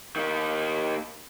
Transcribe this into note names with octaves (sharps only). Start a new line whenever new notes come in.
D#3 A#3